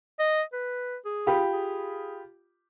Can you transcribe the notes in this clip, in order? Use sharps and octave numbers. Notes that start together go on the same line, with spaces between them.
D#5
B4
G#4
F4 G4 B5
G#4